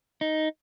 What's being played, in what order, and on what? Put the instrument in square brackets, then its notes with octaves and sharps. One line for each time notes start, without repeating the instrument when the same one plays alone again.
[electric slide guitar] D#4